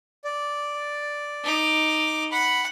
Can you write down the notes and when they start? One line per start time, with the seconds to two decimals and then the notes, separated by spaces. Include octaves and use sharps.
0.24 D5
1.44 D#4 D6
2.32 F#5 B5